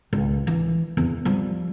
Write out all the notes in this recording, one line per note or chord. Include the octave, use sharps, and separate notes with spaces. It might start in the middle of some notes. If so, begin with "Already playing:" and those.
C#2
E3
E2
F3 G3